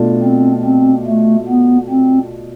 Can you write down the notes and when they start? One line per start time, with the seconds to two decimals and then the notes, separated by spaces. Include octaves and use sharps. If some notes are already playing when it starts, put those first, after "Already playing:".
Already playing: B2 A3 D4 F4
0.23 C4
0.65 C4
1.07 A3
1.48 B3
1.90 C4